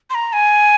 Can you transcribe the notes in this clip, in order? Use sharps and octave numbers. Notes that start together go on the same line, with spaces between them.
C6
A#5
G#5